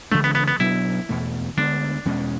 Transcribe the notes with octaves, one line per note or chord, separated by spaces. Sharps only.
C#3 E3 G#3 A3 D4
B3
B3
B3
B2 F#3 B3 D4 E4
E2 B2 A3
D2 D3 G#3 B3 D4
E2 B2 G#3 C#4